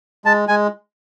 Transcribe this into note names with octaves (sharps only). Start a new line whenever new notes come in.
G#3 A5
G#3 G#5